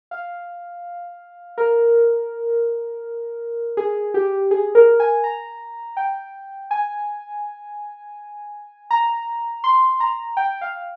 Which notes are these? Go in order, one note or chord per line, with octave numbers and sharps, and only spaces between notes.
F5
A#4
G#4
G4
G#4
A#4
G#5
A#5
G5
G#5
A#5
C6
A#5
G5
F5